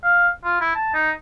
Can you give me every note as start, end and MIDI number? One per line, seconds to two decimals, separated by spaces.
0.04 0.28 77
0.44 0.58 65
0.61 0.72 64
0.75 0.90 81
0.95 1.11 63